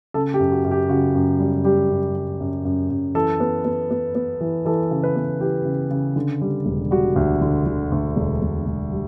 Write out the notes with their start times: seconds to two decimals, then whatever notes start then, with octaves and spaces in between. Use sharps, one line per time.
0.14 C#3 A4
0.34 G4
0.39 F#2
0.52 F#4
0.64 F#2
0.71 G4
0.89 C#3 F#4
1.15 F#2
1.40 G3
1.64 G3 G4
1.90 F#2
2.15 G3
2.40 F#2
2.65 F#2
2.90 F#2
3.15 E3 A4
3.40 B3
3.65 B3
3.91 B3
4.15 B3
4.41 E3
4.66 E3 A4
4.91 C#3
5.03 B4
5.16 B3
5.40 E3 G4
5.65 C#3
5.91 C#3
6.16 D3
6.41 G3
6.66 E1
6.91 G3 F#4
7.16 D2
7.41 D3
7.66 D3
7.92 D2
8.16 E1
8.42 E1
8.67 E1
8.92 G3